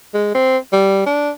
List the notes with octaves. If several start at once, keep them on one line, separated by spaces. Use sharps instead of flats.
G#3
C4
G3
D4